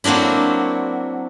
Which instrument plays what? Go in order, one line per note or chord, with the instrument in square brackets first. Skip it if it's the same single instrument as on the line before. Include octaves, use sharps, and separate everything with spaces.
[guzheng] F#3 A#3 C4 D4 E4